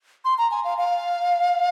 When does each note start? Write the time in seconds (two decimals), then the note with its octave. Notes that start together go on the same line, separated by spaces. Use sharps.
0.25 C6
0.38 A#5
0.51 G#5
0.65 F5
0.78 F5